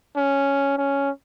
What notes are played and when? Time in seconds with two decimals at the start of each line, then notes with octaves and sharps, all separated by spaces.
0.17 C#4
0.78 C#4